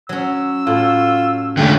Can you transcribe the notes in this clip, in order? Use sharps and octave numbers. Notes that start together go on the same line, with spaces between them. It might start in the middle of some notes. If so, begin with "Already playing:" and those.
F#3 C#4 E6
A2 F4
D3 G#3 A3 G5